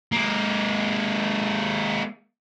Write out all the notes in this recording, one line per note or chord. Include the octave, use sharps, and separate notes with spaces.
G#3 A#3